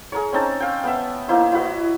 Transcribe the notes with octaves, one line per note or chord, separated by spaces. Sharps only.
G#4 A#4 C#5
C4 C#4 D#4 A5
F5 G5
B3 E5
A#3 D#4 E4 C5
E4 F#4 B4 D#5